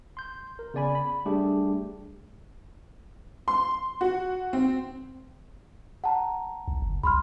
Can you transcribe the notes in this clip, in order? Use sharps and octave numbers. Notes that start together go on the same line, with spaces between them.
C6 G6
A#4
C#3 B3 D5 G#5 B5
B5
G3 A3 D4 G4 G#4
C6
F#4
C4
F#5 A5 A#5
B1
F#1
C2 B5 C6 F6